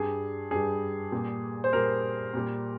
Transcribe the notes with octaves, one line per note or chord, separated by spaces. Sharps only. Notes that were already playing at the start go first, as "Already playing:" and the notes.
Already playing: G2 G3 G#4
G2 G3 G#4
A#2 G3
C5
A#2 G3 A#4
A#2 G3